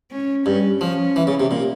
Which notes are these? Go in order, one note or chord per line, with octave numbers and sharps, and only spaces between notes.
C#4
G2 C#4
F3 C#4
E3
C#3
C3
A#2